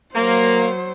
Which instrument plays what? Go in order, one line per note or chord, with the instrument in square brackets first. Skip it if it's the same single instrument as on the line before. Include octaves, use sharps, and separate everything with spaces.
[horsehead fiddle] F#3 C5 [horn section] A#3